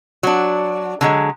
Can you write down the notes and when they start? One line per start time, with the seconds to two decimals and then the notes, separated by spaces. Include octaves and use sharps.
0.23 F#3 D4
1.01 D3 F#3 G#3